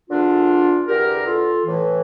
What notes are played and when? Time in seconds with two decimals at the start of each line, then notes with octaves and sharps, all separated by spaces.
0.09 E2 D3 D4 F4
0.87 E2 D3 G4 A#4
1.26 F4 A4
1.65 A2 E3